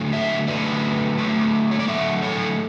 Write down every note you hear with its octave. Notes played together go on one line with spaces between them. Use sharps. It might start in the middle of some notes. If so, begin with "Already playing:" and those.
Already playing: D3 F#3 A3
C#5 E5
D3 F#3 A3 B4 D5
D3 F#3 A3
C#5
D5
D3 F#3 A3 C#5 E5
A4 C#5